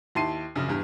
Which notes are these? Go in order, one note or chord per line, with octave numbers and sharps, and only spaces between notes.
D#2 E4 A5 C6 C7 D#7
A#1 F#2 C#3
E2 G2